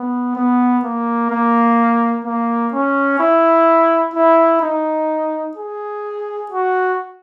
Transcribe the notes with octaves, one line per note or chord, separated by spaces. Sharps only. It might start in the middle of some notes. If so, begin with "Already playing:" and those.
Already playing: B3
B3
A#3
A#3
A#3
C#4
E4
E4
D#4
G#4
F#4